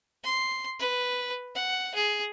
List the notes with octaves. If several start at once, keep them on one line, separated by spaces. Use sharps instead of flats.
C6
B4
F#5
G#4